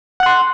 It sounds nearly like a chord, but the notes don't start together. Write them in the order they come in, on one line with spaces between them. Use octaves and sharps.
F#5 F#6 C6